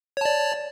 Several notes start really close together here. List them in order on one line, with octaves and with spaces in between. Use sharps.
C#5 A5 D5